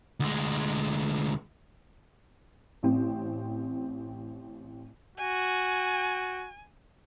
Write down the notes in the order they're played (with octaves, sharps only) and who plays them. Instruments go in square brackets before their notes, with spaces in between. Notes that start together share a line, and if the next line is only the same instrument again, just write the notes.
[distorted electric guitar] D2 G#3
[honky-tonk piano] A1 C4
[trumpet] F#4 [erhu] G#5